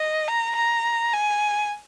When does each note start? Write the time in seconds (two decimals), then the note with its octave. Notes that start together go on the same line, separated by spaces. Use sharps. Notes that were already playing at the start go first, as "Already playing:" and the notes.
Already playing: D#5
0.28 A#5
0.56 A#5
1.13 G#5